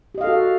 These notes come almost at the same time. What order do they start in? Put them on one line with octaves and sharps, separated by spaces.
G4 D#5 F5 A4 F#4